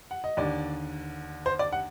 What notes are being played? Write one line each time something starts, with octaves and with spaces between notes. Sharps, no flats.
F#5
D#5
D#2 D3 D5
C5
D5
F#5